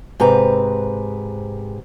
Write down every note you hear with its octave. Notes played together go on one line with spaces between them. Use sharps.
G#2 C3 B4 A#5